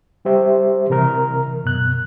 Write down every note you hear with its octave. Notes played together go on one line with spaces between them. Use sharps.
G3 G4 C5 E5
C3 E3 A#4 A#5 F6
F#2 B2 F#6